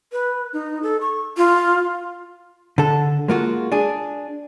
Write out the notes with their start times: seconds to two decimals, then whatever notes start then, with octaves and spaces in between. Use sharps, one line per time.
0.12 B4
0.53 D#4
0.83 A4
1.01 C#6
1.37 F4
2.78 D3 A4
3.28 G#3 A#3 F4 F#4
3.72 D4 G#4